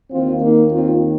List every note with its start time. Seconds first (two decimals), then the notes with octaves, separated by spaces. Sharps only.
0.12 D#2 D#3 C4 F4
0.42 A#3 D#4
0.71 C4 F4